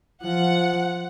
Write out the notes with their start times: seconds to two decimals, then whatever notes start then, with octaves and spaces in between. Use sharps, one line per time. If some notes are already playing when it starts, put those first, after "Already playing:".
0.24 F3 F#5